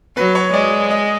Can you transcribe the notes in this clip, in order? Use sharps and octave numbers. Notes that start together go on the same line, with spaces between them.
F#3 B4
C#5
G#3 D5
D#5